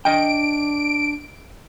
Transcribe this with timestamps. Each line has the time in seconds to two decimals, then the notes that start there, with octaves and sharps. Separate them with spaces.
0.05 D4 D#5 G5 D7